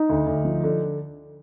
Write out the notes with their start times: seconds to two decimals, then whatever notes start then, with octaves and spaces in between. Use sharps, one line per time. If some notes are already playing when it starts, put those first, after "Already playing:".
Already playing: D#4
0.09 D2
0.27 D2
0.45 F3
0.64 D3